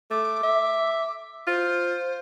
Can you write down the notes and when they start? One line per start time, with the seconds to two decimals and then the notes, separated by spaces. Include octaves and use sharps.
0.11 A3 D6
0.43 E5
1.47 F4 C5